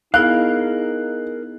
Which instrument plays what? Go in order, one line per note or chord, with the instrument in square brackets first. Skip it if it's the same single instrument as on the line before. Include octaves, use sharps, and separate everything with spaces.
[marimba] B3 E4 [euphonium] D#4 [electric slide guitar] G#4 A#4 F5 [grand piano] F#6